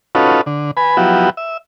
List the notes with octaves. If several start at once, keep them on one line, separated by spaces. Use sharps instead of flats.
C#4 D#4 F4 F#4 A4 B4
D3
B4 G#5 B5
F3 F#3 B3 E4 F#4 G4
E5